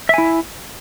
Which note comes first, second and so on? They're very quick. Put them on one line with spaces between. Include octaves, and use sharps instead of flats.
E5 G#5 E4